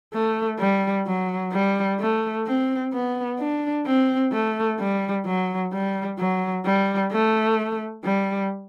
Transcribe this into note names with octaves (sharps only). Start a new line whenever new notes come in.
A3
G3
F#3
G3
A3
C4
B3
D4
C4
A3
G3
F#3
G3
F#3
G3
A3
G3